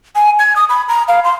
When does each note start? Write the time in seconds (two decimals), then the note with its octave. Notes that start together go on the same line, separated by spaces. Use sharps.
0.15 G#5
0.39 G#6
0.56 D#6
0.69 B5
0.88 A#5
1.08 F5
1.24 C6